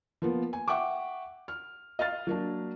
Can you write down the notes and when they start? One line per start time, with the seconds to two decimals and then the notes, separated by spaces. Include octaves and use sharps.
0.22 F3 A#3 B3
0.53 G#5
0.68 E5 F#5 G5 C#6 D6
1.48 F6
1.99 D#5 F5 F6 A6
2.27 F#3 A#3 D4